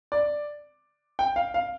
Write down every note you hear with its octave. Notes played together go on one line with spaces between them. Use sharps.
D5
G5
F5
F5